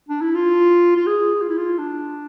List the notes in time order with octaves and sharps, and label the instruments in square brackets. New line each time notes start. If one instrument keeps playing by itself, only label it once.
[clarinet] D4
E4
F4
F4
G#4
F4
E4
F4
D4